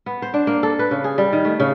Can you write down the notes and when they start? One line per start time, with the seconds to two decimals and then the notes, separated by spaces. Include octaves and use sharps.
0.06 B3
0.22 C5
0.34 D4
0.47 A#3
0.63 A4
0.79 B4
0.91 C#3
1.04 G#4
1.18 G3
1.33 D#3
1.45 A3
1.60 C#3